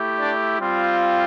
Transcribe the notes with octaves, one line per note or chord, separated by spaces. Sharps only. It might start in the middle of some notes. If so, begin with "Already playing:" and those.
Already playing: A3 E4 G4
D4 D5
G3 C4 F4